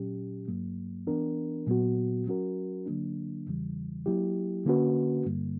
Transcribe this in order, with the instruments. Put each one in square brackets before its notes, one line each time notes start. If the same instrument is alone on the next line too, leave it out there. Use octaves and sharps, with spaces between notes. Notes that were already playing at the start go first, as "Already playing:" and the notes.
Already playing: [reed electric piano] A#2 F#3 C#4 G4
G2 F#3 A#3
E3 B3 D4 A#4
A#2 F#3 B3 F#4
F#3 C#4 F#4 A#4
D3 F#3 A#3 D4
E2 C#3 E3 G3
F#3 A#3 E4 G4
D3 A#3 C#4 F#4 B4
G2 D3 G3 A#3